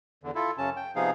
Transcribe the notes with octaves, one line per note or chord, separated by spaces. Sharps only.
E2 D3
E4 F4 A4
F#2 C#3 C#4 A5
G5
C3 F3 B3 D#4 G#4 F5